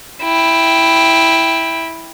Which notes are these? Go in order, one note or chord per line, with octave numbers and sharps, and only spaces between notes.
E4 G5